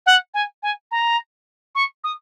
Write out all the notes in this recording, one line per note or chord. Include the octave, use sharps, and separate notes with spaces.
F#5
G#5
G#5
A#5
C#6
D#6